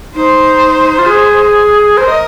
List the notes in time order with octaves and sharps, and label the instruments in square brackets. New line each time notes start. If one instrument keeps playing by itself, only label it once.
[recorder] D#4 [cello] C5
[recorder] F4
G#4
[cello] A#4 [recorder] C5
[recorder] D#5